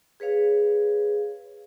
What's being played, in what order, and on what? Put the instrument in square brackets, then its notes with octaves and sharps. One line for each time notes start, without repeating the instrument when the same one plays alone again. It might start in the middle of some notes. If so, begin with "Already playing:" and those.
[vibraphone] G#4 B4 C#5 F5